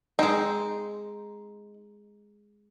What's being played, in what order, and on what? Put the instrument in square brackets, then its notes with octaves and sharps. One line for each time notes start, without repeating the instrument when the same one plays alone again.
[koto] G#3 C4 [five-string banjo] D#4